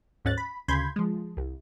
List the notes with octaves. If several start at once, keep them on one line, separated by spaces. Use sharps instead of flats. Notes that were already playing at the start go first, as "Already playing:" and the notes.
D2 G#2 C#4 F#6 A6
B5
D2 C#3 B5 C6 G6 G#6
F3 G#3
C2